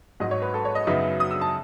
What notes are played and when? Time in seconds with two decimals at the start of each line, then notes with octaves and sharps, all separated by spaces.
0.20 G#1 G#2 F#3 D#5
0.31 C#5
0.42 B4
0.54 A4
0.65 C#5
0.75 D#5
0.87 F#2 C#3 F#3 B3 D#4 E5
1.20 D#6
1.31 E6
1.41 A5